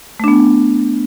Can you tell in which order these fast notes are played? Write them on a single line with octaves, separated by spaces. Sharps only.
A3 D4 B3